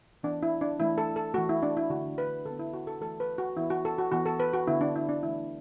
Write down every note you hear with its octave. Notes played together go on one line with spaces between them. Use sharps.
E3 B3 D4
E4
D4
E3 A3 E4
A4
A4
E3 A3 F#4
E4
D4
E4
D3 A3 F#4
B4
D3 A4
B3
E4
F#4
A4
E3 A3 A4
B4
F#4
E3 B3 E4
F#4
A4
F#4
E3 B3 F#4
A4
B4
F#4
D3 B3 E4
D4
E4
D4
E3 A3 E4